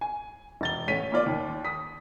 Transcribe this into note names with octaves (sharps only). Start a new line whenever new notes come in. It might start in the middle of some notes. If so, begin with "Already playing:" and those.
G#5
E1 A6 G7
A1 C#5 B6 D#7
A#3 C#4 F4 D5
D#2
D#6 B6